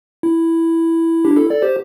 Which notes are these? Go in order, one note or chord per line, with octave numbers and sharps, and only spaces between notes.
E4
D4 G4
E4 A4
A4 D5
G4 C5